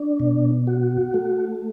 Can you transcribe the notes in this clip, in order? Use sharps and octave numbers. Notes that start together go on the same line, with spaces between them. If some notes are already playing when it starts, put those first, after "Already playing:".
Already playing: D4
B2
F#4
A3